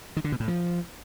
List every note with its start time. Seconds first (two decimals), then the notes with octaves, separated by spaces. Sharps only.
0.17 D#3
0.24 D3
0.32 B2
0.40 A2
0.48 F3